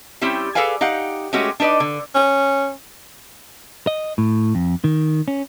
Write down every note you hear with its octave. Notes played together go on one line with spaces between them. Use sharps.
G3 C4 C#4 E4 G4
G#4 A4 B4 D5 F5 G#5
D#4 G4 F5 F#5
G#3 A3 C#4 F#4 G4
D4 D#4 B4 D5 D#5
D3
C#4
D#5
A2
F2
D#3
C#4